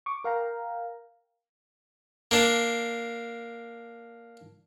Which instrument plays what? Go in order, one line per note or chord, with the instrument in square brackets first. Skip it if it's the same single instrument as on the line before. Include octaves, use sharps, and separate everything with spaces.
[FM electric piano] C#6 D6
A#4 F5 G5 A#5
[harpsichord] A#3 D4